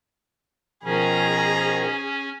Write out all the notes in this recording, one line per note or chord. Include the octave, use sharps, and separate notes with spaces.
B2 D#3 F3 C#4 G#4 A#5